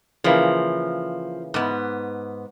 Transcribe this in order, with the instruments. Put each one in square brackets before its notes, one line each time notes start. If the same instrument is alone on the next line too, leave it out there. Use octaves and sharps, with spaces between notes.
[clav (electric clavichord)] C#3 E3 A#3 [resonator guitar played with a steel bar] F3
[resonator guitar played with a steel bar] G#2 B3